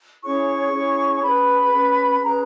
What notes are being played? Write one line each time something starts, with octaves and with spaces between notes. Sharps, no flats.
C#4 E4 G#4 C#5 C#6
C#4 E4 G#4 C#5
C#4 G#4 B4 B5
C#4 G#4 B4
C#4 G#4 B4 A#5